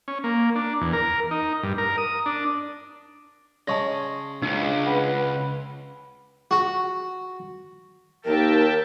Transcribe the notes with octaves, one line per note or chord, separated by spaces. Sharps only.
C#4
A#3
D4
E2
A#4
D#4
G2
A#4
D#6
D4
C#3 G#3 A5 C#6 A#6
C#2 D4
B4 F#5
F#4
D#2 A#4 E5 G5 A5